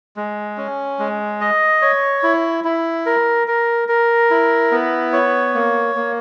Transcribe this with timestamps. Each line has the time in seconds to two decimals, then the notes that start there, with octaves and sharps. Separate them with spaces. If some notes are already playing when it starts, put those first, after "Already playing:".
0.16 G#3
0.57 C#4
0.99 G#3
1.41 D#5
1.82 C#5
2.23 E4
2.64 E4
3.06 A#4
3.47 A#4
3.88 A#4
4.30 E4
4.72 B3
5.13 C#5
5.55 A#3
5.96 A#3